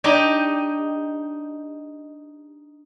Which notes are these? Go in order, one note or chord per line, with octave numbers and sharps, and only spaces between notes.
D4 D#4 G4 D#5